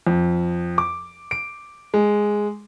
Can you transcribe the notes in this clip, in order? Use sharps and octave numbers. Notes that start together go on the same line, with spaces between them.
F2
D6
D7
G#3